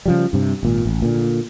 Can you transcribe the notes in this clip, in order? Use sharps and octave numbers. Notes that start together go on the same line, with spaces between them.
C#3 F3 G3
G2 C3
G#1 A#2
A1
A#2 D3